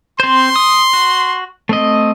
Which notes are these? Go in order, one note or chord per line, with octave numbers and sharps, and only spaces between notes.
C4 C5 C6
D#6
F#4
A3 C4 D#5